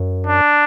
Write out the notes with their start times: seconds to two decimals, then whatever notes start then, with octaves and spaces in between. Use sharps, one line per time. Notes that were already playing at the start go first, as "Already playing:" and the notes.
Already playing: F#2
0.27 D4